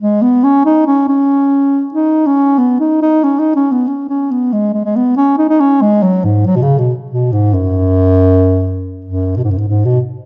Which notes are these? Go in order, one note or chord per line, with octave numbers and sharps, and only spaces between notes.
G#3
B3
C#4
D#4
C#4
C#4
D#4
C#4
B3
D#4
D#4
C#4
D#4
C#4
B3
C#4
C#4
B3
G#3
G#3
G#3
B3
C#4
D#4
D#4
C#4
G#3
F#3
G#2
F#3
B2
C#3
B2
B2
G#2
F#2
F#2
B2
G#2
F#2
G#2
G#2
B2